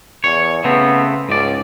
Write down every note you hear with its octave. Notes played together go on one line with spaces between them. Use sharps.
E2 C#5
C#3 A3 B3 C4
C#2 G#2 D5